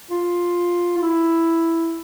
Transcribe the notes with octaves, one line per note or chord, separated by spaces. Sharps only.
F4
F4
E4